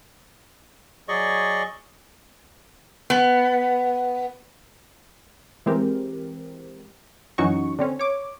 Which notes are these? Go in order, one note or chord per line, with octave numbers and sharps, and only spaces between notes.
F#3 G#4 D5 D#5 C#6
B3
E3 G#3 C4 G4 A#4
F#2 E3 C#4 D#4 F#4 C#6
D3 C4 C#4
C#5 D6